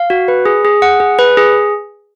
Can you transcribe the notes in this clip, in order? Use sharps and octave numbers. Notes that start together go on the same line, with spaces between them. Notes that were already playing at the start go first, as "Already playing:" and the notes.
Already playing: F5
F#4
B4
G#4
G#4
F#5
G#4
B4
G#4